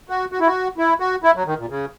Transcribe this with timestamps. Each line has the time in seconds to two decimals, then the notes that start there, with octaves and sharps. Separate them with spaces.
0.09 F#4
0.32 F#4
0.40 E4
0.47 F#4
0.78 E4
1.00 F#4
1.23 E4
1.35 F#3
1.46 D#3
1.58 A#2
1.69 C#3